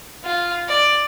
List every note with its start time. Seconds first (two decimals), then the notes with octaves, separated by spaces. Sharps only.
0.24 F4
0.69 D5